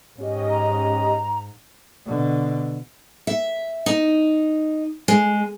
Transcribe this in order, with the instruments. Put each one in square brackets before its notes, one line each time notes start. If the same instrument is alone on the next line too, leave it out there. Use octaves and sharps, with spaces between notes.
[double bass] G#2 [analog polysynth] C#4 G4 D#5
[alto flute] A#5
[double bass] B2 D3
[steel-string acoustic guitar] E5
D#4
G#3